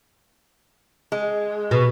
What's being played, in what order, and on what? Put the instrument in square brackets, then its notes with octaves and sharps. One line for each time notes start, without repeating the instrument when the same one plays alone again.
[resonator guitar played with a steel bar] G#3
[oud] B2